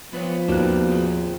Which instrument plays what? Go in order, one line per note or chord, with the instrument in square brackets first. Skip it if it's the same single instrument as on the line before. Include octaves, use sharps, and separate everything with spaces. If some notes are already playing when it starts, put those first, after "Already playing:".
[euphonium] F3 [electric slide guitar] B3 B4 C#5
[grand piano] D#2 G4 F#6 [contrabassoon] B2 [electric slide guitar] D4 D#4 F4
[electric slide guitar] C4 G#4 G5